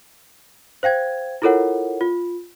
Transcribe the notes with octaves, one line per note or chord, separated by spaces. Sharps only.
C5 F5 G5 G#6
E4 F4 A4 A#4 C#5 F#5
F4